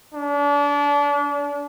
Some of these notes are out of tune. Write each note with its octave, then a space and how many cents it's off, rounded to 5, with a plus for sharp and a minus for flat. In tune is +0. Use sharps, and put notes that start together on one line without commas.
D4 -35